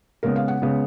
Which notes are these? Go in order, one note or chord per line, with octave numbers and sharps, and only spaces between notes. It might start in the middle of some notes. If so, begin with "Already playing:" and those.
C#3 G#3 B3 A#4
F5
F#5
C#3 G#3 B3